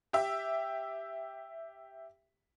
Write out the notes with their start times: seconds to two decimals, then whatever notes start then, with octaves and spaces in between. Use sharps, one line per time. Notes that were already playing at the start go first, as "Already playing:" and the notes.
0.13 G4 E5